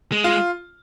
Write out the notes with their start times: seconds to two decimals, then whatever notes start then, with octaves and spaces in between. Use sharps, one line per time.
0.12 G#3
0.24 F4